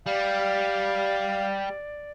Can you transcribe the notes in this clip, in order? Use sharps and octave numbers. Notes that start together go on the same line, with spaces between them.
G3 D5 F5